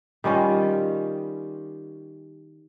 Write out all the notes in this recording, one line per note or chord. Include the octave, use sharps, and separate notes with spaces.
D#3 G3 C#4 F4